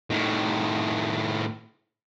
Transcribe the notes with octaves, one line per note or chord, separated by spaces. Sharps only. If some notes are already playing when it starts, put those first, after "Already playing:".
A2 D#3